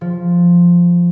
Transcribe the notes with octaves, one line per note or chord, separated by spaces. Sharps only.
F3